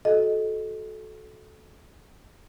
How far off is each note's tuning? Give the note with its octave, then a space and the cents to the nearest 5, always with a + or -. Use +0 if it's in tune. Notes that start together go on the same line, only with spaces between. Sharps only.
F#4 +0 A4 -20 D#5 +0